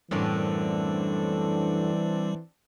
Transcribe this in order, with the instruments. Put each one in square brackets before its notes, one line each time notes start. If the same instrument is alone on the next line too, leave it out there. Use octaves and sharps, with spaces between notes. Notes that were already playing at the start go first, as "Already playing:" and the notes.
[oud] F#2 A2 D3 [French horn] E3 [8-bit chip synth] G3 [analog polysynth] C4 D4 A4